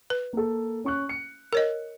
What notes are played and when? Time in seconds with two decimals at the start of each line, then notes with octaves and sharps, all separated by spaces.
0.10 B4
0.33 A#3 A4
0.84 C#4 C#6 F#6
1.09 C#7
1.53 A#4 C#5 D#5